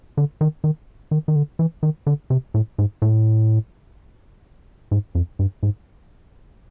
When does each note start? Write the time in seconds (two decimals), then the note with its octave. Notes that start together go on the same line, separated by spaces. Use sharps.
0.17 D3
0.41 D#3
0.64 D#3
1.11 D#3
1.28 D#3
1.35 D3
1.59 E3
1.83 D#3
2.07 D3
2.30 C3
2.54 A2
2.78 G#2
3.02 A2
4.91 G#2
5.15 F2
5.39 G2
5.63 G#2